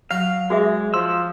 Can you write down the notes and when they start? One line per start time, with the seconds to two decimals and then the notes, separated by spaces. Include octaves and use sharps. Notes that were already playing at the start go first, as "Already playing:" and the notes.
0.11 F#3 F5
0.50 G#3 F#4 G#4 E5
0.94 F3 C6 E6